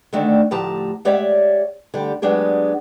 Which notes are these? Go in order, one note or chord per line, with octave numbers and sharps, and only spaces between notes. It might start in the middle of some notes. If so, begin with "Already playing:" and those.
D3 D#3 A3 C4 D4
D2 A2 F3 G4 A5 A#5
G#3 G4 C#5 D5 E5 F#5
D3 G3 G4
F#3 G#3 B3 D4 G4 G#4